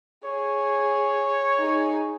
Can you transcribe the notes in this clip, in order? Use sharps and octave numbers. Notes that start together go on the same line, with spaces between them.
G#4 C#5
D#4 G#4